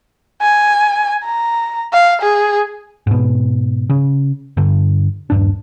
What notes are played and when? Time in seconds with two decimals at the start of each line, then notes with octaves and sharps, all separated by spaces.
0.42 G#5
1.24 A#5
1.93 F5
2.22 G#4
3.07 G#2 B2
3.90 C#3
4.57 G2 D3
5.30 D#1 G2 D4